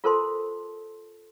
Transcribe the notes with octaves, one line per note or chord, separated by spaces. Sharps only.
F4 A4 A#4 C5 A5 C6